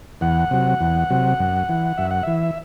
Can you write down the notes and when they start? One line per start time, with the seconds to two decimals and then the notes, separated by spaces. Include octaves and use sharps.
0.21 E2 F#5
0.51 C3 F#3
0.80 E2
1.10 C3 F#3
1.40 F#2
1.69 E3
1.98 F#2 E5
2.11 F#5
2.23 E3 E5